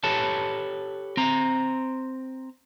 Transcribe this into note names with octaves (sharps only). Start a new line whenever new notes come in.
G4 A4 B4 C#5 A5
C4 A#5